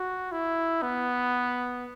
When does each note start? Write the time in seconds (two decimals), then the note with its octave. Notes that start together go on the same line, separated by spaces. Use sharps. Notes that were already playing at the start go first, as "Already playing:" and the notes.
Already playing: F#4
0.32 E4
0.83 B3